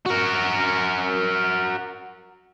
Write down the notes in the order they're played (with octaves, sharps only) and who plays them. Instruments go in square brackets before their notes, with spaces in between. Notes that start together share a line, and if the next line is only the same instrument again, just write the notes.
[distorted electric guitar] F#4 A#4